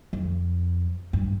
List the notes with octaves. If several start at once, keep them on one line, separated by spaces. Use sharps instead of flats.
F2
G2